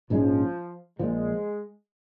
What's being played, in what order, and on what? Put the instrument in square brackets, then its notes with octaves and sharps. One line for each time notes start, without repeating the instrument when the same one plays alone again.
[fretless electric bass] A#1 G#2 G#3 C#4 [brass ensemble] F3
[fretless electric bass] A#1 A#2 F3 [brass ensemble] G#3